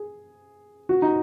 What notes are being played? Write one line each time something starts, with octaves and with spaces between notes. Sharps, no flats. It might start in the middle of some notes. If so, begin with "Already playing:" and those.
Already playing: G#4
F#4
D#4